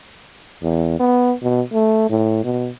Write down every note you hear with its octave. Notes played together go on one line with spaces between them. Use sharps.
E2
B3
B2
A3
A2
B2